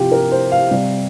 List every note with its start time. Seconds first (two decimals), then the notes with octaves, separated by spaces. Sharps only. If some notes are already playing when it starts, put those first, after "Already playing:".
Already playing: C3 F3 F4 G4
0.12 A#4
0.32 C5
0.52 F5
0.71 C3 G3